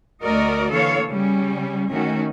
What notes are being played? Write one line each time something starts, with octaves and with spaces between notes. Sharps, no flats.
D2 A3 F#4 A#4 D5 D#5
D3 E3 A#3 A4 C#5 F5
C#3 G3 C#4
D#3 A3 C#4 F#4